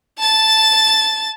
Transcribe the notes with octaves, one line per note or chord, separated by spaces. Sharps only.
A5 A6